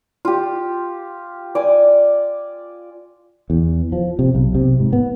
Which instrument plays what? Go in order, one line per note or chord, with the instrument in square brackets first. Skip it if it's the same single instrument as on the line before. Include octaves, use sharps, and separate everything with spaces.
[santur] F4 G4
D5 G#5 D#6
[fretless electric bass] E2
F3
C3
B1
C3
G#2
B3